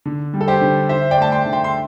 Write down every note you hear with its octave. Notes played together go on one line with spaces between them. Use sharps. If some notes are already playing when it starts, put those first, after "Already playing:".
D3
G3
A4
G4 C5
D3
D3 C5 E5
D5 G5
A3 A5
G5 C6
D3
G5 C6
C6